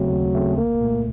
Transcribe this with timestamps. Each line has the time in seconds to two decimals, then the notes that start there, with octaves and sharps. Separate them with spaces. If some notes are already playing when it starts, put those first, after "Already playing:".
Already playing: D#2 C#3 F#3 A3 C4
0.11 D#2
0.34 C#3 A3 C4
0.57 C2 A#3
0.80 A#2 A3